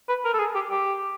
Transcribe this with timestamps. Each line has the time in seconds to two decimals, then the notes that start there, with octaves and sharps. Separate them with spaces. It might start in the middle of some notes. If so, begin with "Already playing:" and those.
0.09 B4
0.25 A#4
0.34 A4
0.40 G#4
0.55 G4
0.70 G4